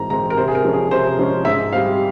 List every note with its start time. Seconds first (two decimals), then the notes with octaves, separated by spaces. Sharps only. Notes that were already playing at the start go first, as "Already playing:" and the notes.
Already playing: G#2 E3 G#3 C4 A#5
0.10 E3 G#3 C4 A#5
0.30 A#4
0.37 C3 C5
0.48 G#4
0.55 A#4
0.64 F3 G#3 C#4
0.73 G#4
0.91 C3 C5
1.19 F3 G#3 C#4
1.45 G#2 E5
1.73 G3 C4 F5